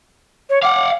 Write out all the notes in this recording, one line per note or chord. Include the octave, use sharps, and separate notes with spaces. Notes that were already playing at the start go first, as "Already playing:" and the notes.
C#5
F5 F#5 D6